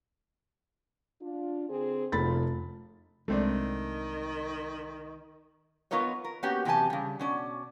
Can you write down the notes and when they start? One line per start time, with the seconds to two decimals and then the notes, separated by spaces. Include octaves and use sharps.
1.21 D4 F4
1.69 D3 C4 G#4
2.12 F1 F#2 F4 B5 A6
3.28 C2 D#3 G#3 A3 C4 D4
5.91 B3 F4 A#4 C#5 D#5
6.24 A#4
6.43 A#3 B3 C#4 F#4 G4
6.65 E2 C3 F#3 G4 G#5 A5
6.90 C#3 G3
7.19 B2 C#4 D5